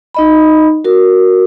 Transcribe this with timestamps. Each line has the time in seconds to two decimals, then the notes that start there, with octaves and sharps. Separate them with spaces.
0.15 D#4 D#5 B5
0.85 F#4 A#4